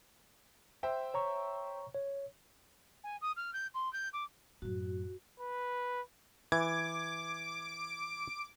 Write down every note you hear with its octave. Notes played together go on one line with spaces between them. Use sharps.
C5 E5 G5
C#5 A#5 C#6
C#5
G#5
D#6
F6
G6
C6
G6
D6
F#2 A2 F#4
B4
E3 D6 G#6